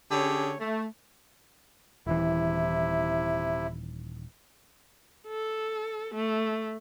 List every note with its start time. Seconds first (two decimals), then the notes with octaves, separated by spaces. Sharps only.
0.11 D3 C#4 G4 G#4 C#5
0.58 A3
2.07 D#1 C3 E3 E4
5.27 A4
6.14 A3